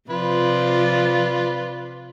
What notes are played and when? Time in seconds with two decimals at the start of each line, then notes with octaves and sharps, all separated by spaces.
0.10 C3 F3 F4 B4 D5